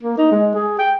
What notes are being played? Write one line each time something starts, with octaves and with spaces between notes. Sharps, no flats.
A#3
D#4
G#3
G#4
G5